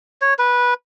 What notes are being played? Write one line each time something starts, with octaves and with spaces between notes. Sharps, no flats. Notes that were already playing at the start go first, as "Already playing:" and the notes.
C#5
B4